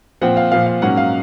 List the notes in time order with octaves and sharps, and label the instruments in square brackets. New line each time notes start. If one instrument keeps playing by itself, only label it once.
[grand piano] A#2 F3 C4 F#5
F5
A#2 F3 C4 F5
F5
G#2 F#3 A#3 C#4 F#5
F5